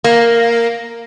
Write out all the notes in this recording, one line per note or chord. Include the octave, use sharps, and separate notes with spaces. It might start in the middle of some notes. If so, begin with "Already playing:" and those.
A#3